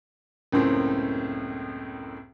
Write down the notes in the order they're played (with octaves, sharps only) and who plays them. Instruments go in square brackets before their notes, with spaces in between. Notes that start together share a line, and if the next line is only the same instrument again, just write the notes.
[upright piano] C#2 F#2 A2 A#3 C4 C#4